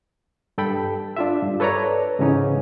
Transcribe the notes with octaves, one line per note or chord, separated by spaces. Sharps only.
G2 A4 G5 B5
D4 F4 E5
G2
A4 B4 C#5 D5 A#5
G#2 C#3 E3 C#4 D#4